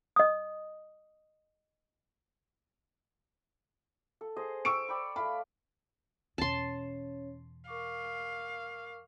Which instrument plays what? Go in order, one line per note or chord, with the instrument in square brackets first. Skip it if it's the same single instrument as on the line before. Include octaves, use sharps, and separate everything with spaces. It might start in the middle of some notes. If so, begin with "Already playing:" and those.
[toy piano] D#5 D#6
[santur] A4
G#4 C5 D#5
[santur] G5 [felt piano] C#6 E6 D7
[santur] D5 G5 B5
[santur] A3 F5 [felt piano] B5
[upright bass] E2 B2 [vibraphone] C#4 C#5 [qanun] A5 C6
[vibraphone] A#4 C#6 D6 [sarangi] F5